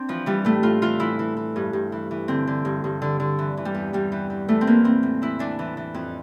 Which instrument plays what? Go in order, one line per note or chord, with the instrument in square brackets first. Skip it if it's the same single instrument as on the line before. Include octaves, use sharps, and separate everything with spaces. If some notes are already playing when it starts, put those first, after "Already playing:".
Already playing: [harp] C4 D4
E3 F3
E3 G3
A2 A3
A2 F4
E3 F4
E3 E4
E3
E3
G2
G2
E3
E3
D3 C4
D3
G2
G2
D3
D3
E3
E3
G3
E2
E2 G3
E3
E3
E3 A3
C4
E3 A#3
A2 C4
A2
E3 E4
E3 D4
E3
E3
F2